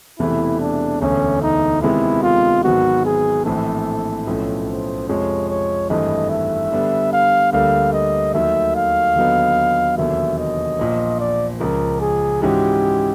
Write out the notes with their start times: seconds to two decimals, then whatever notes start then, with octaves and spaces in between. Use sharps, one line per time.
0.19 E1 E2 C3 E3 A3 E4
0.60 D4
1.01 E1 D2 D3 C#4
1.43 D#4
1.82 C3 D#3 G#3 B3 E4
2.23 F4
2.64 G#1 G#2 D#3 F#3 B3 F#4
3.05 G#4
3.45 A#1 A2 E3 A3 C4 A4
4.27 B1 A2 F3 A3 C#4
4.68 C5
5.09 F2 C3 F3 G#3 C#5
5.49 C#5
5.90 G#1 G2 E3 A3 D#5
6.30 E5
6.72 D3 G3 B3
7.13 F5
7.53 D2 D3 G3 A#3 F5
7.93 D#5
8.34 D#2 D#3 F#3 A3 E5
8.75 F5
9.15 D#2 D3 F#3 B3 D#4
9.98 E1 D#2 D3 F#3 A#3 E5
10.39 D#5
10.79 A#1 A#2 F3
11.20 D5
11.60 C#2 C#3 F3 A#4
12.01 G#4
12.42 G#2 E3 G#3 C#4 F#4 G4